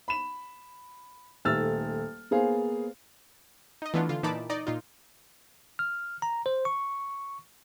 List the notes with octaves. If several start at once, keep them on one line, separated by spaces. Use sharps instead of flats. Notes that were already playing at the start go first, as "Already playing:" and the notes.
B5 E7
D#1 A3 E6 F6 A6
A#3 B3 G#4 C5 F5
D#4 D#5
E3 A3 B3 D4 F4
D3 F4
A#2 E3 D#4 A5 B5 D6
D#4 D5 D#5
A#2 D#4 F4
F6
A#5
C5
C#6